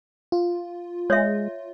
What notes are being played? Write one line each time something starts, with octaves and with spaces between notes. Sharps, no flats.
F4
G#3 C#5 E5